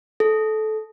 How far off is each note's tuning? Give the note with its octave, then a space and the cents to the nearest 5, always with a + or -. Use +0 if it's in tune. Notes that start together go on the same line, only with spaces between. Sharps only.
A4 -20